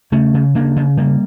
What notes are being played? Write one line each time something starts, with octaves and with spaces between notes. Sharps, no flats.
C#3 A3 C#4
C#3
C#3 A#3 D4
C#3
C#3 G3 A#3